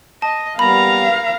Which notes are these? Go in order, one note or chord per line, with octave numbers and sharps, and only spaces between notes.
D#5 A5
G3 A#3 B3 F5 A#5 B5